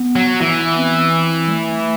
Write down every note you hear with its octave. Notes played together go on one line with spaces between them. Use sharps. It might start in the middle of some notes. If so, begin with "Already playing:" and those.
Already playing: B3
F#3
E3 B3
C4
C4
G3
A3